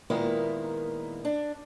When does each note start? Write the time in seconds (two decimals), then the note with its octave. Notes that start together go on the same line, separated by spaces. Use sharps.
0.10 A#2 D#3 G#3 A#3 B3 E4
1.25 D4